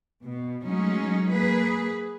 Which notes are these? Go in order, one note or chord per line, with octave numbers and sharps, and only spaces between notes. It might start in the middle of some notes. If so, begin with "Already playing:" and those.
B2
F#3 G#3 A3 C#4 D#4
A#3 G#4 B4